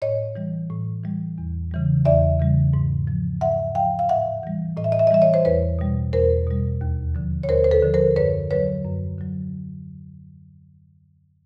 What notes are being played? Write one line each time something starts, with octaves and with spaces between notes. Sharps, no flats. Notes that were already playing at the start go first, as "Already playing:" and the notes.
A2 C#5 D#5
E3 G3
A2
E3 G3
E2
C#3 E3 G3
E2 D5 E5
C#3 E3 G3
G#2
F3
G#2 E5 F#5
F3 F5 G5
F5
A2 E5 F#5
E3 G3
A2 D#5
E5
D#5
E5
D#5
E3 G3 E5
C#5 D#5
C5
E2 B4 C#5
B2 G3
E2 A#4 C5
B2 G3
D#2
D3 F3
C#5
D#2 A#4 C5
C5
A4 B4
D3 F3
A#4 C5
F#2 B4 C#5
D3 F#3 B4 C#5
F#2
D3 F#3